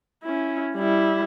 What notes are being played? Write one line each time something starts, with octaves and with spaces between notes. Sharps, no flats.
C#4 E4
G3 E4